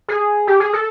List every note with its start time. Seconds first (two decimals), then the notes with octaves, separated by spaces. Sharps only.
0.08 G#4
0.47 G4
0.60 G#4
0.73 A4